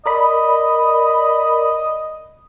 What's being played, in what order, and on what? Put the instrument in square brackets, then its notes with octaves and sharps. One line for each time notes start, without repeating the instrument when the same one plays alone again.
[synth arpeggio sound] A#4 D5 B5 [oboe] D#5